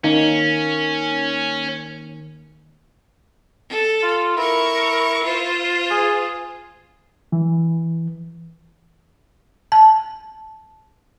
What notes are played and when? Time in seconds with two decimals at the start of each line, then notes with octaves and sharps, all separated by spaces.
0.04 D#3 A#3 C#4
3.69 A4
4.03 F4
4.37 E4 A#4 C#6
5.24 F4 C5
5.91 G#4
7.32 E3
9.72 A5